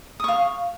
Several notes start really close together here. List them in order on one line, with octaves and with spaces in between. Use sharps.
D#6 C#6 F5